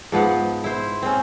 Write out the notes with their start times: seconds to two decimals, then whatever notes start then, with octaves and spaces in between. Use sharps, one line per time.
0.12 G#2 F3 B3 F#5
0.64 E4 C5
1.03 C4 C#4